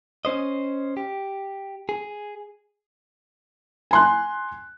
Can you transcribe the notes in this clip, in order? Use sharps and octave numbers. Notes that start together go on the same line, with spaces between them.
C#4 C5 D#5
G4
G#4
G#5 C6 F#6